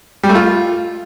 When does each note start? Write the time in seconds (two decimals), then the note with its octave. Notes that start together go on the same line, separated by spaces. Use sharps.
0.23 G3
0.29 A3
0.35 F4